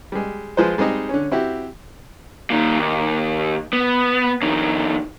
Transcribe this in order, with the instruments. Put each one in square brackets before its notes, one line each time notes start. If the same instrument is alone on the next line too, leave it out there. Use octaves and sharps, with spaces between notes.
[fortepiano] G3 G#3
F3 G#3 B4 C5
G3 G#3 C4 D#4 D#5
D3 C#4
C4 E4 F#4 G4
[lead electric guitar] A#2 D#3
D#2
B3
F2 D#3